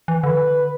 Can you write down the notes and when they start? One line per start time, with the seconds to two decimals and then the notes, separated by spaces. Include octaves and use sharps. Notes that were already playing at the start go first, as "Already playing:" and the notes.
0.08 E3
0.23 D3 B4